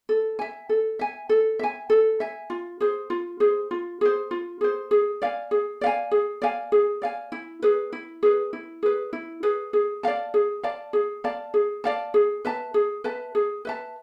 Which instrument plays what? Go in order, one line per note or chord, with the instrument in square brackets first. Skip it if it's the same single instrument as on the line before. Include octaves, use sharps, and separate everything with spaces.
[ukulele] A4
E5 G#5
A4
E5 G#5
A4
E5 G#5
A4
E5 G#5
F4
G#4 C5
F4
G#4 C5
F4
G#4 C5
F4
G#4 C5
G#4
D5 F5 G#5
G#4
D5 F5 G#5
G#4
D5 F5 G#5
G#4
D5 F5 G#5
E4
G#4 B4
E4
G#4 B4
E4
G#4 B4
E4
G#4 B4
G#4
D5 F5 A5
G#4
D5 F5 A5
G#4
D5 F5 A5
G#4
D5 F5 A5
G#4
B4 E5 A5
G#4
B4 E5 A5
G#4
B4 E5 A5